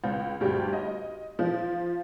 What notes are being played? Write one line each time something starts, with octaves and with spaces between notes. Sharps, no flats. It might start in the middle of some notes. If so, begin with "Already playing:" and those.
C#2
D2 G2 G4
D#5
F3